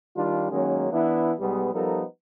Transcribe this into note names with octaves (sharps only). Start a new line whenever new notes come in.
D#3 G3 D4 F4
D#3 F#3 G#3 A#3 C#4
E3 B3 D4 E4
B1 G3 G#3 B3
F3 G3 B3 D#4 A4 A#4